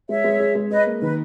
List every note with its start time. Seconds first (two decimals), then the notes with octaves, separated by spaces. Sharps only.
0.09 G#3 C#5 E5
0.24 G#3
0.40 G#4
0.55 G#3
0.70 G#4 B4 D#5
0.86 A#3
1.02 D#3 B4